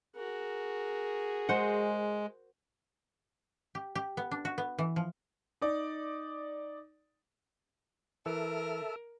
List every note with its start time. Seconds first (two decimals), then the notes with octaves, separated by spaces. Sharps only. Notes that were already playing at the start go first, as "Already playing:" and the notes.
0.16 F#4 G#4 A#4
1.49 G#3 C5 F#5
3.75 G4
3.95 G4
4.17 B3
4.31 D4
4.45 F#4
4.58 B3
4.79 E3
4.96 F3
5.62 D#4 D5
8.26 E3 A4 A#4 E5